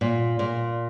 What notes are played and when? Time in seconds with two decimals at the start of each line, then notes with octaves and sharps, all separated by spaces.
0.01 A#2
0.39 A#2